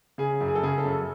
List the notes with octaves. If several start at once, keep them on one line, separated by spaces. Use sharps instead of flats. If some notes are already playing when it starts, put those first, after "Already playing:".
C#3 G#4
F#2
G#4
A4
C#3 G#4
A4
F#2